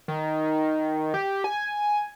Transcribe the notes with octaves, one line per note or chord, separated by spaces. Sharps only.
D#3
G4
G#5